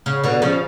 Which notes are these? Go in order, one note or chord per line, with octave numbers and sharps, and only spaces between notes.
C#3
B2 D3
C#3 F3